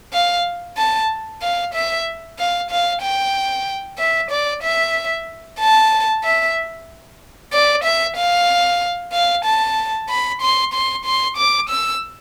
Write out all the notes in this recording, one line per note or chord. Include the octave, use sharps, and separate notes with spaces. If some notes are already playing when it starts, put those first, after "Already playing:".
F5
A5
F5
E5
F5
F5
G5
E5
D5
E5
A5
E5
D5
E5
F5
F5
A5
B5
C6
C6
C6
D6
E6